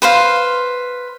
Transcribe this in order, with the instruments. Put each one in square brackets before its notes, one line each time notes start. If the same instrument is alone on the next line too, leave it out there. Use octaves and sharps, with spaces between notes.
[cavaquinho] B4 C5 F5